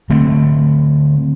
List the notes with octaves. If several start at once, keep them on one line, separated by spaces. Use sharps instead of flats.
D3 A3 C4